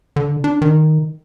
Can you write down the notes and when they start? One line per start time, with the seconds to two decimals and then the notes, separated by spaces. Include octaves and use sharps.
0.16 D3
0.44 D4
0.62 D#3